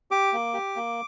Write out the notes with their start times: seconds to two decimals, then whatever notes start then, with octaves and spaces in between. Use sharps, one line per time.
0.11 G4 D6
0.33 A#3
0.54 G4
0.76 A#3